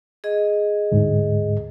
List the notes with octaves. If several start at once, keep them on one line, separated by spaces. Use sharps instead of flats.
G#4 D#5
D2 G#2